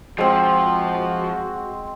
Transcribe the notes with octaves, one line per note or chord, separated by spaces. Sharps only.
F3 G#3 C4 F#4 C5